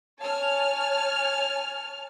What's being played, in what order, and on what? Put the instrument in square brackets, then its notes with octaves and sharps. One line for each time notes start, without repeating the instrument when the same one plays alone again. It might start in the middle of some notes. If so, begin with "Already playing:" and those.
[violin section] C#5 G#5 A5 F6